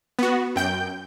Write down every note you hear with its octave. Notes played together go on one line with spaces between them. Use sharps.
B3 F#4
F#2 G5 G6